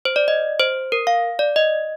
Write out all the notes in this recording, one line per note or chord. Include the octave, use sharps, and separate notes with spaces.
C5
D5
D#5
C5
A#4
F5
D5
D#5